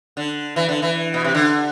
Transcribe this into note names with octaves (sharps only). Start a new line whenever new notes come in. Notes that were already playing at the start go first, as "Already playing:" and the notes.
D3
E3
D3
E3
B2
C3
D3